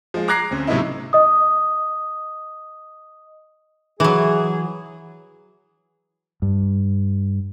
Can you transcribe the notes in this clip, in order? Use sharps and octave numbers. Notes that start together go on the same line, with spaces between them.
F3 G#3
A#5 D6 F#6 G#6 A#6 C7
D2 C4 C#4
A2 C3 F#3 B3 D#4 E4
D#5 D#6
E3 F#3 G#4
G2